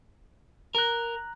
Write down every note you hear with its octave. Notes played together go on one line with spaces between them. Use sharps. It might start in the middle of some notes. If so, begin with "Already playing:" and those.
A#4 A#5 F#6